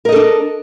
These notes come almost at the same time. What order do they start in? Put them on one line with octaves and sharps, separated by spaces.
A#4 D#5 A4 D4